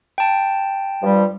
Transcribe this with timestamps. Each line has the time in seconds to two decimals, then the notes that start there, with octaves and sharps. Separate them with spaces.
0.18 G5 A5
1.02 G2 F3 G3